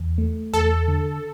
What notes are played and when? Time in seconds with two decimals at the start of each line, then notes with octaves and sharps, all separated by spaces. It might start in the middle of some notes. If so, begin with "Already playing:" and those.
Already playing: E2
0.18 A3
0.53 E2 A4
0.88 D3